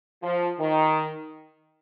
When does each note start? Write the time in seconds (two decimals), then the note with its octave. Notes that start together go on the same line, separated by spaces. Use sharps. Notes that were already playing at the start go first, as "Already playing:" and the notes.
0.23 F3
0.60 D#3